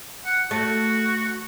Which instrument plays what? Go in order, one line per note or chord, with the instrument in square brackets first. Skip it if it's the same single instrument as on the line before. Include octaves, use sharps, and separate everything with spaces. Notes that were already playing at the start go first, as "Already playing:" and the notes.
[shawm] F#5
[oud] A3 [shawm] F#4